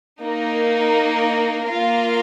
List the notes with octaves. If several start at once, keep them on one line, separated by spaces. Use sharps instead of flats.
A#3 D#4 A#4
A#3 F4 A#4 F5